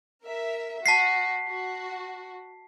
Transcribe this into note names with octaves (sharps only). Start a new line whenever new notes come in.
A#4 E5
F#4 A5 B6 C7
F#4